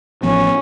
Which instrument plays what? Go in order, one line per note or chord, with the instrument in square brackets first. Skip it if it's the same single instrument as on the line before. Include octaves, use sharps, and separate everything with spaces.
[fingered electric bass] A1 A2 F3 B3 [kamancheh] C#4